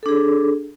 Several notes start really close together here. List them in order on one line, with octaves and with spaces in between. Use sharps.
A4 D4 G#4